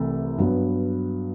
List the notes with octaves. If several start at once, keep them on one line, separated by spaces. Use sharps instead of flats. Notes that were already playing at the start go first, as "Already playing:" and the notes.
Already playing: C2 C3 E3 A3
G2 F#3 B3